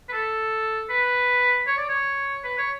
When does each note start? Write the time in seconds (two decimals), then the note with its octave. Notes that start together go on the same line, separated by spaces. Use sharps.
0.09 B4
0.13 A4
0.90 B4
1.67 C#5
1.78 D5
1.89 C#5
2.44 B4
2.58 C#5